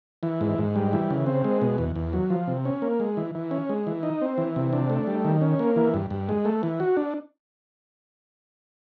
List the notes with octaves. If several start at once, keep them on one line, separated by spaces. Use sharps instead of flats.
E3
G#2
G#2
G3
E3
C#3
C4
G#3
B2
E2
E2
F#3
F3
C3
C#4
A#3
G#3
E3
E3
C#4
G#3
E3
D#4
C4
E3
C3
D4
A3
G3
D#3
C#4
A#3
E3
G2
G2
G#3
A3
E3
F#4
D4